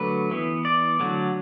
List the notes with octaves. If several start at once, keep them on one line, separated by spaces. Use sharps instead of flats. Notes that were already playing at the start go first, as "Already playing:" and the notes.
Already playing: D3 F#3 A3 B4
E3 B3
D5
D3 F#3 A3